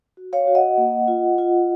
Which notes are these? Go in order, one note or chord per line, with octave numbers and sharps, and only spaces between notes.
F#4
C#5 F5
F#4
D#5 F#5
A#3
F4
F4